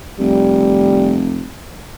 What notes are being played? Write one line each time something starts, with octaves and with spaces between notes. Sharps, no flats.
F1 G3